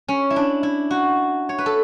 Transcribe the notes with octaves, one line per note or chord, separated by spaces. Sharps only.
C#4
E4
D4
E4
F#4
C#5
B4
A4